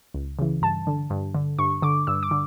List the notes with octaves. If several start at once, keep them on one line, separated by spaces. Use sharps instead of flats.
C#2
C#3 E3
G2 A5
D3
G2
D3
G2 C#6
D3 D6
G2 E6
D6
D3